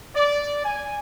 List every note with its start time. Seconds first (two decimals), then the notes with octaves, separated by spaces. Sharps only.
0.15 D5
0.64 G#5